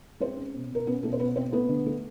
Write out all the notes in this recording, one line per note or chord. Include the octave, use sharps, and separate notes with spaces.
G#3 C4 C5
C#4
B2
B2 A#4
B3 C#4 B4
B2 A3 A4
C5
B2 B3 B4
B2 C4 C5
A3 B3 B4
D3
A3